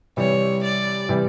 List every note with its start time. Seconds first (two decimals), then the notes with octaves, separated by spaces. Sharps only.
0.17 C3 E3 G3 C#5
0.63 D5
1.09 C3 E3 G3